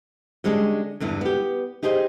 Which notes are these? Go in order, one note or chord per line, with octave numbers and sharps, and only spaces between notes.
D3 G3 G#3 C#4 D4 G#4
E2 G2 D3 E3
B3 G4
D#4 G4 G#4 C5 D#5